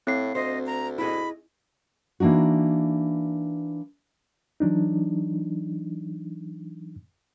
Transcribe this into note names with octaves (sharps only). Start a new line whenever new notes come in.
A2 C4 C7
D2 C5 D#5
A#5
E4 G#4 D#5 B5
E3 A#3 D4 D#4 F#4
E3 F#3 D4 D#4